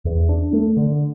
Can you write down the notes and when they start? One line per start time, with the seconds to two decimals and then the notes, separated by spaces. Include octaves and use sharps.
0.05 E2
0.29 D4
0.53 A3
0.77 D3